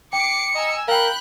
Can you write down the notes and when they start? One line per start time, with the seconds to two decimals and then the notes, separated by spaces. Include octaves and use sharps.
0.13 G5 D6 C7 C#7
0.55 D#5 G#5 A#5 E6
0.88 A#4 F5 G5 B5 F#6 G6